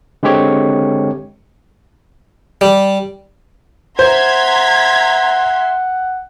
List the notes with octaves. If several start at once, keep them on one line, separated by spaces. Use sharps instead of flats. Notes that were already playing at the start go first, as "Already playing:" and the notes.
D3 G#3 C4 G4 C#5
G3
C5 E5 F#5 A#5 C6 G#6 B6